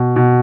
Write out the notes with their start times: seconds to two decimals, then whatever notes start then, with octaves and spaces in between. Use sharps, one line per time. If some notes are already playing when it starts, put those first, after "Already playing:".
Already playing: B2
0.16 B2